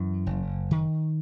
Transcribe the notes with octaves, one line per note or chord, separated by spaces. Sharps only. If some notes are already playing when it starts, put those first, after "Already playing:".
Already playing: F#2 E3
F#1
D#3